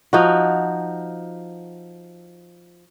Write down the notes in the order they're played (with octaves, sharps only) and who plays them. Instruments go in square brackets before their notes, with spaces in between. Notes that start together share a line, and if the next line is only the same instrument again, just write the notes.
[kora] F3 D#4 F#4